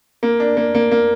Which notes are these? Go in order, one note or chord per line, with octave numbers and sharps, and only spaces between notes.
A#3
D4
A#3
A#3
A#3